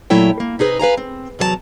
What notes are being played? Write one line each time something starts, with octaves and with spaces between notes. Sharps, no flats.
A#2 F#3 A3 E4 C#5 G5
A#3
C3 D#4 G#4 B4 D#5
B4 F5 G#5 A#5
C4
E2 C3 F#3 A4 A5 A#5